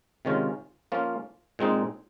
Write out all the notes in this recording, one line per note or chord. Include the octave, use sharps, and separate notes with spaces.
C3 D#3 G#3 C#4 F4
F3 A#3 C#4 F4
A#2 G#3 C4 D#4